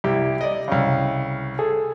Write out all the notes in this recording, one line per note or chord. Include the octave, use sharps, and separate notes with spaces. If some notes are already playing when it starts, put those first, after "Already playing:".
C2 E4 G4
D5 D#5
C2 C#3
G#4 A4